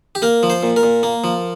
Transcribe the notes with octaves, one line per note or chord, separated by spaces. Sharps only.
G4
A#3 A#4
F3
C5
A#2
A#4
A#2
A#3
F3